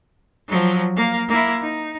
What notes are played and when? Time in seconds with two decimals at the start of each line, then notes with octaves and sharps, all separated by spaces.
0.48 F3 F#3
0.96 A#3 F5
1.28 A#3 E4
1.62 D#4